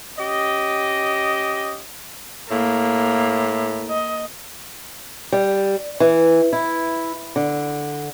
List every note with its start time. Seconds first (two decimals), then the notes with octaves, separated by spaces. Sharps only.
0.17 C#4 G4 D#5
2.50 A2 A#3
3.90 D#5
5.32 G3
6.00 E3
6.53 E4
7.36 D3